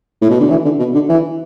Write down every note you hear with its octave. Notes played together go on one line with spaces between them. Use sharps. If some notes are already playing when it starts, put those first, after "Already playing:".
A2
B2
D3
E3
D3
B2
D3
E3